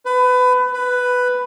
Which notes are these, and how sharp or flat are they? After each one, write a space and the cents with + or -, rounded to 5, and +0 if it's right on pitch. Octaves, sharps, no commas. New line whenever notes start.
B4 +25
B4 +5